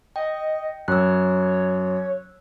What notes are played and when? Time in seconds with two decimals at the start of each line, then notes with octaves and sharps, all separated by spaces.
0.16 D#5 G5
0.88 F#2 C#5 E6 F#6